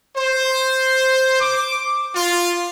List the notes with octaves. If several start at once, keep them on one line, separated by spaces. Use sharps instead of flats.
C5
D6
F4